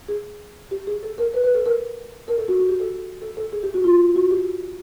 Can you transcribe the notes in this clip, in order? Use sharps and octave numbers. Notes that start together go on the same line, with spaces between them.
G#4
G4
G#4
A4
A#4
B4
B4
A4
A#4
A#4
A4
F#4
F#4
G4
A4
A4
A4
G#4
G4
F#4
F4
F#4
G4